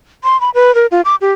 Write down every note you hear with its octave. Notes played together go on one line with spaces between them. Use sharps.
C6
B5
B4
A#4
F4
D6
G4